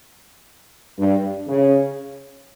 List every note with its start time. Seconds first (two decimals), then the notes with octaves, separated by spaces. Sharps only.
0.98 G2
1.47 C#3